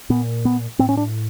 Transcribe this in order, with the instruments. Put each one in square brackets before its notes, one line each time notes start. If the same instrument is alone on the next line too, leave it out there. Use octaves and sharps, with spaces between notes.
[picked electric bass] A#2 B3
B3
A2 C4
C#4
D4